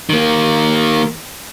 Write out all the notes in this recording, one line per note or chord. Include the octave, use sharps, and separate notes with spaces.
D#3 A#3